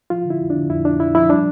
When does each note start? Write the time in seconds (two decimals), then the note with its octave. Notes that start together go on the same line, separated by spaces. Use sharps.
0.10 F3 F4
0.26 D3 E4
0.41 F2
0.50 D4
0.56 D3
0.70 F2 E4
0.85 F2 D4
1.00 F2 E4
1.15 F3 E4
1.30 G3 D4